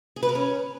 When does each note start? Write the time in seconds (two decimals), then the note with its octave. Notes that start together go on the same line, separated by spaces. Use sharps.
0.16 G#4
0.23 B4
0.29 A#4
0.35 C#4